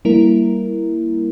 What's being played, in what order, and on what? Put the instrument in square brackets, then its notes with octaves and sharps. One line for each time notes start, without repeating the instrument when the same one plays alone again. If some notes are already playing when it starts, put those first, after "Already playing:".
[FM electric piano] G3 A#3 E4 A#4